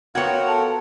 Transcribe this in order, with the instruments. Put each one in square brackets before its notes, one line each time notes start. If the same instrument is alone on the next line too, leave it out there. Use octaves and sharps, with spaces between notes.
[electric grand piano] B3 G5 G#6 [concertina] F4 A#4 F#5 [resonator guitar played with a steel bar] F#4 C#5
[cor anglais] A4